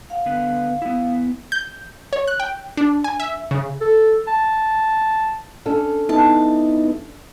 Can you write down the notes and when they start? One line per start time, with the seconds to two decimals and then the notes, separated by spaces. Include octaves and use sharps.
0.10 F5 F#5
0.26 D3 B3 B4
0.82 B3 E4
1.52 G6
2.13 C#5
2.27 F#6
2.40 G5
2.77 D4
3.04 G#5
3.20 E5
3.51 C#3
3.81 A4
4.28 A5
5.66 C#4 D4 A4
6.09 B3 D#4 E4 A5